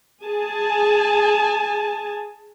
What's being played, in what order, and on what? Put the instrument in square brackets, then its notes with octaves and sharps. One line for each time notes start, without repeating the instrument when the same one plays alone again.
[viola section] G#4 G#5 A5